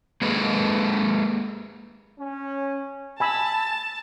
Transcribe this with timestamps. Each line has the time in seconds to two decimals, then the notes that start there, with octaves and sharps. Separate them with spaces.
0.22 G#3 A#3 G#4 A4 B4
2.19 C#4
3.20 G#5 A5 B5 E6